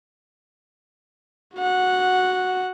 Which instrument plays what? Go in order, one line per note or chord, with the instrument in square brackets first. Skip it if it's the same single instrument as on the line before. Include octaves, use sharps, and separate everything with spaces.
[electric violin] F#4 F#5